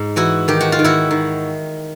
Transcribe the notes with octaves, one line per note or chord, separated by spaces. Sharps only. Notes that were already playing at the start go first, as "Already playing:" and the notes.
Already playing: G#2
E3 E4 F#4
D#3 G4
F#4
F4
D#3
E4 F#4
D#3